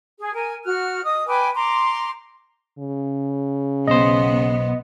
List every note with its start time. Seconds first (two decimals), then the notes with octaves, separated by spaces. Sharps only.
0.18 G#4
0.33 A#4 G#5
0.65 F#4 F6 F#6
1.03 D#5 D#6
1.27 B4 G5 G#5 D6
1.54 A#5 C6 D6
2.78 C#3
3.87 B1 B3 C5 D#5